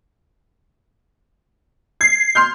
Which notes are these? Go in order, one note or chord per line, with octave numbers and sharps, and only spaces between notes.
G#6 C7
C6 F6 G6